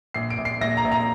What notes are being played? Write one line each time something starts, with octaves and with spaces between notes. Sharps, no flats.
A#1 C7
D7
A#1
C7
A#1 A#6
A#5
A#1
A#5